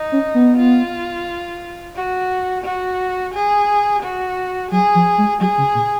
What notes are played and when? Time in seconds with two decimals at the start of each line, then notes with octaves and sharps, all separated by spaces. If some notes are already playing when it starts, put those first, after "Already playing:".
Already playing: D#4
0.12 C#4
0.34 B3
0.57 F4
1.95 F#4
2.64 F#4
3.34 G#4
4.02 F#4
4.71 F#3 G#4
4.95 F3
5.18 G#3
5.40 F#3 G#4
5.58 C#3
5.75 A#2